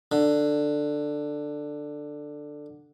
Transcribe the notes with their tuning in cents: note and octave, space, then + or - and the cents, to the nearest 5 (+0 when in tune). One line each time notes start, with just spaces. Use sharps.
D3 +10